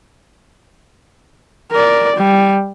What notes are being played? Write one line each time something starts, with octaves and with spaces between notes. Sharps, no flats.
A#4 D5
G3